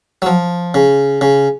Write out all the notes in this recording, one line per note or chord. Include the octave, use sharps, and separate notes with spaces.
F#3
F3
C#3
C#3